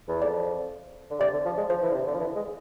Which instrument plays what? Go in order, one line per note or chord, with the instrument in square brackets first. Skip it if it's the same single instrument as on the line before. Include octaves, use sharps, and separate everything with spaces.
[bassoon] E2
[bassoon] F2 [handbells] D5
[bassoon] D3
[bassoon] C3 [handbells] D5
[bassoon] D3
F3
G#3
[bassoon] F3 [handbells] C5
[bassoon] E3
D3
C3
D3
F3
E3
G#3